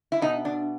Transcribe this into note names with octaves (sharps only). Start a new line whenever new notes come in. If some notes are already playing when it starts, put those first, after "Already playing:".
E4
B2 D#4
D4